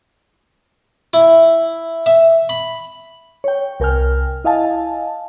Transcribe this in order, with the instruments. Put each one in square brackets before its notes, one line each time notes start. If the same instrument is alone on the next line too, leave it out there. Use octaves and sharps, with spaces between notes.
[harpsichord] E4
E5
B5
[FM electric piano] C#5 G5
C2 A#4 G5 G#5 F6
E4 D#5 F5 G#5 A5